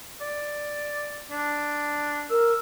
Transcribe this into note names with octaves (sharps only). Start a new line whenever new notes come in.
D5
D4
A#4 E6